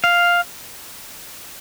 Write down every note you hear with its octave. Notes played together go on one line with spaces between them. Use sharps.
F5